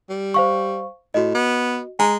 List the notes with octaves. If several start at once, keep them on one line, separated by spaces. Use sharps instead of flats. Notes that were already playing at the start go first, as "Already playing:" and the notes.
G3
C5 F5 C#6
A2 F#4 D#5
B3
G#3 G#5 A#5